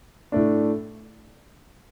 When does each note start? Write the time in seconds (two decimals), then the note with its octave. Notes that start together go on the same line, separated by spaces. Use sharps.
0.32 A2 A3 D4